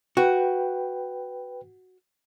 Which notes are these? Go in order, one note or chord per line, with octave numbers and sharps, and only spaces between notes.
F#4 B4 G5